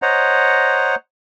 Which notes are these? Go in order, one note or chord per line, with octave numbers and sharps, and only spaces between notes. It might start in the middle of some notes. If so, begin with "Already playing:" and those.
C5 C#5 D#5 F#5 A#5